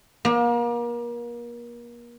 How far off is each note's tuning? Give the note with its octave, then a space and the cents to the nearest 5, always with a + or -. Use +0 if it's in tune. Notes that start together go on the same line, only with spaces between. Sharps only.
A#3 +35